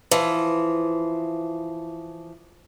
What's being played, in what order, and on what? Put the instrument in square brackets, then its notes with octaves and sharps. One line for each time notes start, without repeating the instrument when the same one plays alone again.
[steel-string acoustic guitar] E3 F3